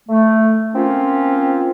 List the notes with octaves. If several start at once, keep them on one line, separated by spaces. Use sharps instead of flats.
A3
A#3 C4 C#4 F4